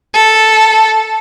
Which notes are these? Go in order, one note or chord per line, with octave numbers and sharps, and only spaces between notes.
A4